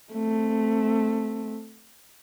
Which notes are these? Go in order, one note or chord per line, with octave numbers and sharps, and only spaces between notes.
A3 C4